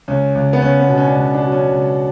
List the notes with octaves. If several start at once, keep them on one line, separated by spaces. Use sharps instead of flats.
C#2 C#4
C#2
B3
C#2 C#4
B3
B2
C#4
D4
C#2 C#4
D4
F#3
C#4
C#2